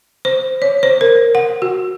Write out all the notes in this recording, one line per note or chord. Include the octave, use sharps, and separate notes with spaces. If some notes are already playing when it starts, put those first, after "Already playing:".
C5
C#5
C5
A#4
F#5
F#4